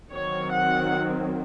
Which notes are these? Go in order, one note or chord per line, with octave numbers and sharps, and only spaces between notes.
D#3 F#3 C4 C#5
F#5